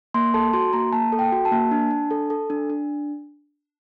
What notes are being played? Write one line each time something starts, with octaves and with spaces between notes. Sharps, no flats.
A#3 C6
A4 A5
F#4 C6
A#3 A#5
A#3 A5
A4
G5
F#4
A5
A#3
D4
D4
A4
A4
D4
D4